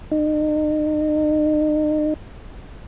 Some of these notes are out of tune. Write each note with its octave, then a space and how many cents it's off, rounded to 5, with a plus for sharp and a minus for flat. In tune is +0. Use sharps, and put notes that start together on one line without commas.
D#4 -35